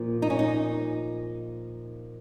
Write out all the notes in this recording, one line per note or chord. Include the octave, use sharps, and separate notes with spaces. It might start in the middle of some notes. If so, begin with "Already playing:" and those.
Already playing: A#2 F3 A#3
D#4
C#4
D#4